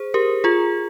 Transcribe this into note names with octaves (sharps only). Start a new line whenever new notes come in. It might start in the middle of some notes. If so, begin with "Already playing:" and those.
Already playing: G#4 C5
G4 A#4
F4 G#4